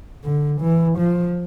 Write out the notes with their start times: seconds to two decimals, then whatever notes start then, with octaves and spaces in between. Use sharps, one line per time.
0.24 D3
0.61 E3
0.99 F3